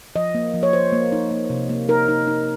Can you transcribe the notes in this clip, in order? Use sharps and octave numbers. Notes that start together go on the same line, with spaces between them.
F3 D#5
A#3
F3
C#5
F3 C5
A#3
D#4
A#3
C3
A#3
D#4 A#4
D#4
D#4